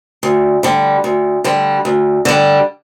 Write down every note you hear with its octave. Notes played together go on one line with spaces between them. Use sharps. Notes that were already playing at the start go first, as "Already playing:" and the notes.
D2
D3 G3
D2
D3 G3
D2
D3 G3